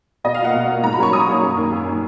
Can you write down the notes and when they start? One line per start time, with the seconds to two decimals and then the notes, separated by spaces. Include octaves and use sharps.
0.24 B2 D#5
0.34 F5
0.40 A#3 F4 F#5
0.54 B2
0.69 A#3 F4
0.83 G#2 A#5
0.93 B5
0.98 F#3 A#3 C#4 C#6
1.13 G#2 D#6
1.28 F#3 A#3 C#4
1.42 F#2
1.57 D#3 A#3
1.71 F#2
1.86 D#3 A#3